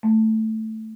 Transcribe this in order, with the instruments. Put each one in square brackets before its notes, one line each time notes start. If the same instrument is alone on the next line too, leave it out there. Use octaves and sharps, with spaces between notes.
[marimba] A3